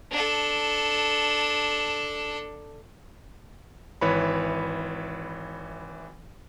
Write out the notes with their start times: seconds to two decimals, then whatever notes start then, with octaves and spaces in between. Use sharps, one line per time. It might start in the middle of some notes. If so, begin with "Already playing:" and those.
0.11 D4 A4
4.01 G#1 E3 B4 C#5 B5